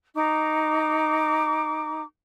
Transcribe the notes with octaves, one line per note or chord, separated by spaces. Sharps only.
D#4 A#5 D6